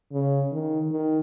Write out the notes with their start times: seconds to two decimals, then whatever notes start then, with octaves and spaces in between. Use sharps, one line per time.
0.13 C#3
0.52 D#3
0.92 D#3